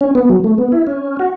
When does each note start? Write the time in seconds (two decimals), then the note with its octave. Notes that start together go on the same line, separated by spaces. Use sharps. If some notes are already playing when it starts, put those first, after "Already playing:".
0.01 C#4
0.15 B3
0.30 F#3
0.44 A3
0.58 B3
0.72 E4
0.87 C#4
1.19 F#4